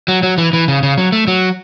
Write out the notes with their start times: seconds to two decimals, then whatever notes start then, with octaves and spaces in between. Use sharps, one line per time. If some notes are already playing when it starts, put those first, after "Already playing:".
0.08 F#3
0.23 F#3
0.38 E3
0.53 E3
0.68 C#3
0.83 C#3
0.98 F#3
1.12 A3
1.27 F#3